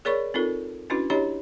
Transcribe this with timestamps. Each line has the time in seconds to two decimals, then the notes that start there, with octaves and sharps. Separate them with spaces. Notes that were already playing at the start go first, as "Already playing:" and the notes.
0.05 G#4 A#4 C#5 D5 B5 C#6
0.34 C4 D#4 F4 A4 A#4
0.90 C#4 D4 E4 F#4 B4
1.10 D4 E4 G4 C#5 D#5 A#5